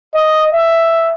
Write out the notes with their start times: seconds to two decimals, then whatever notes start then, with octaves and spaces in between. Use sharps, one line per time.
0.14 D#5
0.52 E5